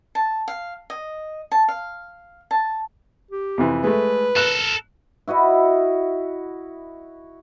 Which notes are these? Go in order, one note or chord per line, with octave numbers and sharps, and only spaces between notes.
A5
F5
D#5
A5
F5
A5
G4
F2 C3 E3
G#3 A3 B4
A4 A#4 F#6
E4 F#4 D#5 B5